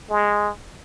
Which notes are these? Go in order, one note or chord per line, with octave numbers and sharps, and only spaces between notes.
G#3